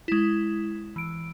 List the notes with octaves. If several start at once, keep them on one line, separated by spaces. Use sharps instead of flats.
G#3 E4
E3 D7